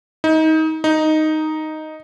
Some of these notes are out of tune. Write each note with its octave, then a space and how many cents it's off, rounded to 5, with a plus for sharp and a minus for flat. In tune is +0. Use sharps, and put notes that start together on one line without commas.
D#4 +25
D#4 +0